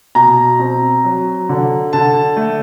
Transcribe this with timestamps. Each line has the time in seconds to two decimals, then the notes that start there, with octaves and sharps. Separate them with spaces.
0.15 B2 A#5
0.59 C4
1.04 F#3
1.49 D3
1.93 D3 A5
2.37 A3